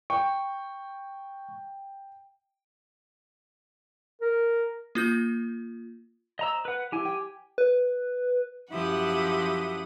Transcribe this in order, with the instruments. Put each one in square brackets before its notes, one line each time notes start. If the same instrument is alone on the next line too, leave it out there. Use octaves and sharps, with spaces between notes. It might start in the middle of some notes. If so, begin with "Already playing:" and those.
[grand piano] G5 [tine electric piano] C#6
[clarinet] A#4
[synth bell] A#3 F4 G6
[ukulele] C5 [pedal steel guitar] D#5 A#5 E6
[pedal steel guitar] B4 F#5
[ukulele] E4 [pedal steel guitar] G4 G#5
[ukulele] G5
[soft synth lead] B4
[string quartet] F#2 F3 E4 G4 F#5 D#6